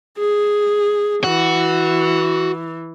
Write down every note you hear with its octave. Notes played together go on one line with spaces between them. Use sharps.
G#4
E3 F#4